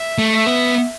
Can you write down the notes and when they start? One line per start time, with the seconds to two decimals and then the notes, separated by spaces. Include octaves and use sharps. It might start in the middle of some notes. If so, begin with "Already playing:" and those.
Already playing: E5
0.18 A3
0.32 E5
0.47 B3